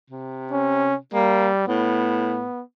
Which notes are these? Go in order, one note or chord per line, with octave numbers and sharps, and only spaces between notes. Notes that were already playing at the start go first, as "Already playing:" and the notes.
C3
C#4
G3 A#3
A2 B3